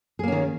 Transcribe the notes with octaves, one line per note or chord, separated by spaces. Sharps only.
D#3 A#3 C#4 G#4